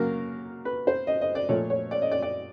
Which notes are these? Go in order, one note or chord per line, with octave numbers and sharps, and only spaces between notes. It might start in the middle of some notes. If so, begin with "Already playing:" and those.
Already playing: C#3 F#3 A#3 A#4
B4
C5
D#5
D#5
D5
A#2 F3 A3 C#5
C#5
D5
D#5
D5
D5